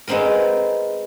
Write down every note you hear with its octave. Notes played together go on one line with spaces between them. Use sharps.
G#3 B3 C4 D#4 A#4